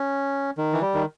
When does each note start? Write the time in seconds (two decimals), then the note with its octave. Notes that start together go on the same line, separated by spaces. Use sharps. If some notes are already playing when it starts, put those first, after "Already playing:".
Already playing: C#4
0.58 D#3
0.73 E3
0.82 G3
0.95 D#3